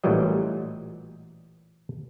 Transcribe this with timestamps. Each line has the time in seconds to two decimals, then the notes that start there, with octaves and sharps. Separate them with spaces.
0.04 A1 A#2 E3 F#3 G3 D#5